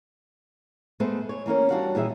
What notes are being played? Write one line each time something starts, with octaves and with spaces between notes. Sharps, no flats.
G#3 A3 B3 B4 C5
C#5
E3 A#3 C4 C#4 A#4
G3 D4 F#4 F5 F#5
A#2 E3 G3 G#4 D#5 E5